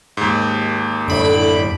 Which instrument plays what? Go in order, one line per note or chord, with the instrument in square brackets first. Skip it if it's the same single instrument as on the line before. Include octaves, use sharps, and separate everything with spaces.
[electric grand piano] D#2 G#2
[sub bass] F#2 [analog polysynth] A2 B5 D7 [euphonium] D3